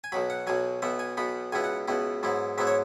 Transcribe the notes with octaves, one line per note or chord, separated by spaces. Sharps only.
G#5
B1 B2 F#3 B5
F#5
B1 B2 F#3 G#5
B1 B2 B3 E5
G#5
B1 B2 B3 B5
C#2 B2 B3 E4 G#5
F#5
C#2 B2 B3 E4
G#2 F#3 B3 E4
G#2 F#3 B3 E4 E5
C#5